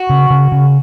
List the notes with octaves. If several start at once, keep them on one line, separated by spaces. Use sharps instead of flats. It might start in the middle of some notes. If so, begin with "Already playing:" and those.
Already playing: F#4
C#3
C#3
C#3